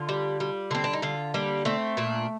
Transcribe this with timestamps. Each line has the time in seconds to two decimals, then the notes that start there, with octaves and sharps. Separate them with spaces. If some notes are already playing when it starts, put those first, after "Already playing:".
Already playing: D3 F4
0.09 G3
0.40 G3
0.71 D3 C4
0.84 D4
0.93 D#4
1.02 D3 F4
1.34 G3 A#3
1.65 A3 C4
1.97 A#2 D4